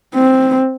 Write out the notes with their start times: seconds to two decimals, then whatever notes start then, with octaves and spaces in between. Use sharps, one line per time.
0.15 C4